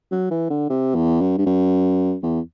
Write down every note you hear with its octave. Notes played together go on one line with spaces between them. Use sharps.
F#3
E3
D3
C3
E2
F#2
G2
F#2
E2